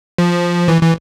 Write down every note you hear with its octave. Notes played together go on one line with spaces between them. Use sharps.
F3
E3
E3